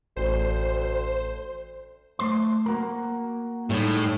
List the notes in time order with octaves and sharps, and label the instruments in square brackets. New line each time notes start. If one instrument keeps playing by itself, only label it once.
[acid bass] A1 [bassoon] D2 [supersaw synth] C5
[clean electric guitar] A3 C5 C6
A#3 F#4 A#4
[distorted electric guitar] A2 [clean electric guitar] G3 G#3 D#4